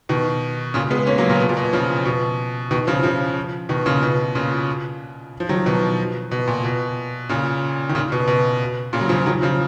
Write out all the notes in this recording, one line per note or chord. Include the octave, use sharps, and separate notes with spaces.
B2 D#3
A#2 C#3
G#3 B3
A#3 C#4
F#3 A#3
A#2 C#3
B2
A#2
B2
C#3 F3
B2
B2 D#3
C#3 F3
C#3 F3
B2 D#3
A#2 C#3
B2
A#2 C#3
F3
D#3 F#3
B2 D#3
B2
A#2
B2
A#2 C#3
D#3
A#2 C#3
B2
B2
A#2 C#3
F#3
C#3 F3
D#3 F#3
C#3 F3